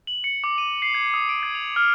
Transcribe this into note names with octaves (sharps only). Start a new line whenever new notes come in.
F#7
C#7
D6
D#7
C7
G#6
D#6
D7
G#6
F7
F6